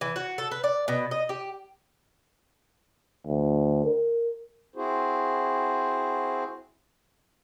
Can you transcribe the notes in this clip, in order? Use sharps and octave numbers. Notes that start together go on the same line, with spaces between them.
E3
F#4
A4
B4
D5
B2
D#5
G4
D2
A#4
C4 E4 F#4 G#4 C5